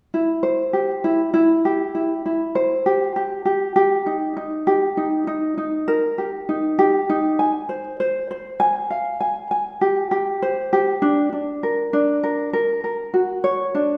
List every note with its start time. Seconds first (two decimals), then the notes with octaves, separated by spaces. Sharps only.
0.14 E4
0.43 C5
0.73 G4
1.04 E4
1.34 E4
1.65 G4
1.95 E4
2.26 E4
2.55 C5
2.86 G4
3.16 G4
3.45 G4
3.76 G4
4.06 D#4
4.37 D#4
4.67 G4
4.97 D#4
5.27 D#4
5.58 D#4
5.88 A#4
6.18 G4
6.49 D#4
6.79 G4
7.09 D#4
7.39 G#5
7.69 C5
8.00 C5
8.31 C5
8.60 G#5
8.90 F5
9.20 G#5
9.51 G#5
9.81 G4
10.11 G4
10.42 C5
10.73 G4
11.02 D4
11.33 D4
11.63 A#4
11.93 D4
12.23 A#4
12.53 A#4
12.84 A#4
13.14 F#4
13.44 C#5
13.75 D4